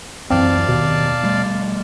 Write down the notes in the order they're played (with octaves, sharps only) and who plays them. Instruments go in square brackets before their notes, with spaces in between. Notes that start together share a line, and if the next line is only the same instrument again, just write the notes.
[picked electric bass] D1 F#2 E3 [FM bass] C4 [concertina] D5 F5 A5
[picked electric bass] D#2 [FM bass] B2
[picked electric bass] G3 A3